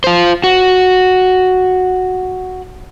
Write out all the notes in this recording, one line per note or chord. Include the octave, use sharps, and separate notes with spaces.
F4 C5
F#4